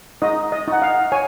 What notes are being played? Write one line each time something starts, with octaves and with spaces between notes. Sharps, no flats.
D#4 D#5
D#5
D#4 F#5
F5
C#5 G#5